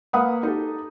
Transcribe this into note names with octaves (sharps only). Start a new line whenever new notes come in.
A#3 B4 F5 F#5 B5 D#6
D#4 G4 A4